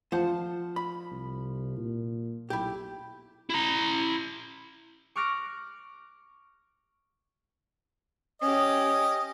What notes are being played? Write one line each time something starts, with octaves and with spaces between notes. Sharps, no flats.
F3 C5 F#5 A5
B5
C2
A#2
B1 E4 G4
E4 A#5
C#6 D6 F6 F#6 A#6 D7
C#4 G4 D#5